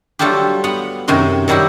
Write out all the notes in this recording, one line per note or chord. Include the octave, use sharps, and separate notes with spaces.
F#3 G3 A3 D4 F4 G4
B3 F#5
F#2 C3 D#3 F#4 C6
D#3 F#3 G3 E4 G4